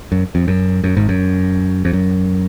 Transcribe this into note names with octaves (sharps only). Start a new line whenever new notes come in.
F#2
F2
F#2
F#2
G#1 G#2
F#2
F2
F#2